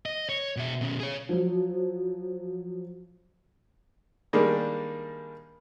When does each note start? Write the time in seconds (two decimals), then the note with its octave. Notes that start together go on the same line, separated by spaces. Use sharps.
0.06 D#5
0.29 C#5
0.56 B2 E5
0.81 B2 C#4
1.00 G#4 C#5
1.29 F3 F#3
4.33 D#3 G3 G#3 A#3 D4